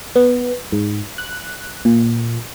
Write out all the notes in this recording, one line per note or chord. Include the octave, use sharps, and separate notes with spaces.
B3
G#2
F#6
A#2